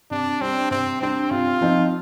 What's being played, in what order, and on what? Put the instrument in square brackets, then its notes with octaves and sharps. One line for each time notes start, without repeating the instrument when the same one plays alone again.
[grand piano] C3 [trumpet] D4
[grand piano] G3 D4 [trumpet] C4
[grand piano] C3 [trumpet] C4
[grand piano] G3 D4 [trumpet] C4
[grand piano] C3 [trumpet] F4
[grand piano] F3 C4 D#4